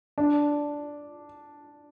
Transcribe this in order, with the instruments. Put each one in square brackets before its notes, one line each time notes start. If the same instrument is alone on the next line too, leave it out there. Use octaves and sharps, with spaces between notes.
[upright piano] D4